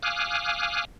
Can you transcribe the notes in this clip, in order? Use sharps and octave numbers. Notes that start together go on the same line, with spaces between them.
F5 G#5 D6 D#6 F6 F#6